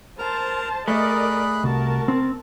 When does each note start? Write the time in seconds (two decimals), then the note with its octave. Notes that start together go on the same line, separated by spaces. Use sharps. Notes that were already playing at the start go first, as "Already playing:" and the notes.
0.19 A#4 C5 A5 A#5
0.88 A3 G#4 A#4 D5 D#5 B5 F#6
1.64 C2 F#4 A#4 A5
2.08 C4